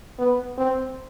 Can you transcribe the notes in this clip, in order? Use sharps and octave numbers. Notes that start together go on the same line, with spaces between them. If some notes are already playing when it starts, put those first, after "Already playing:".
B3
C4